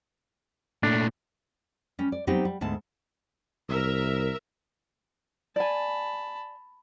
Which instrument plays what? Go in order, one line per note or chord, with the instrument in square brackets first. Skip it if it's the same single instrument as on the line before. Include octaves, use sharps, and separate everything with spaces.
[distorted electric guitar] A#2 A3 [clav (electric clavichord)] D4
[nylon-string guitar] G3 C#4
D5
F#3 G3 B3 C4 D#4 G4
G3
D2 G#2 B3 A5
[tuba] C2 [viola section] A#4 E5
[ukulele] D5 G#5 [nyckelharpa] A5 B5